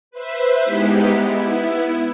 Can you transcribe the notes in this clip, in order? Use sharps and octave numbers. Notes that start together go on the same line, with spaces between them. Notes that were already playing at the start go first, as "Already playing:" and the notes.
B4 C5 E5
G#3 B3 D#4 E4 G4
B3 E4